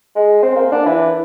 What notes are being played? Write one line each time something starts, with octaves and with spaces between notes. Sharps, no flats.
G#3
C4
A#3
D4
E3